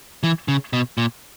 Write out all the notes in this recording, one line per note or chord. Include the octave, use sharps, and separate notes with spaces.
E3
C#3
B2
A#2